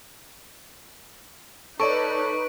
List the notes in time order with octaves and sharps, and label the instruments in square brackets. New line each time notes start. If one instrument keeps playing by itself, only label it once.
[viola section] D#4 B4 [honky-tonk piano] A4 C#5 D5 [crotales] C#6 D7